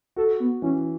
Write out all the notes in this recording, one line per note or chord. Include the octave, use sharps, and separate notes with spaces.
F#4 A4
B3
E3 C#4